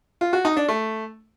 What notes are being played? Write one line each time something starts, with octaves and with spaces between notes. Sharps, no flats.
F4
F#4
D#4
D4
A3